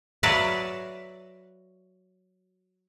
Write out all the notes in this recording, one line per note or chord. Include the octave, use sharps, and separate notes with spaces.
F#3 F#4 B4 D5 E5 F5